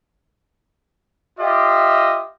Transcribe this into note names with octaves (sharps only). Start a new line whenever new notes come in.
F4 G4 D#5 E5